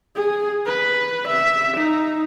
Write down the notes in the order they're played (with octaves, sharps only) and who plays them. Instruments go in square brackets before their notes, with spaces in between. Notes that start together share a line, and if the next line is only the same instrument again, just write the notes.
[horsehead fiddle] G#4
B4
E5
D#4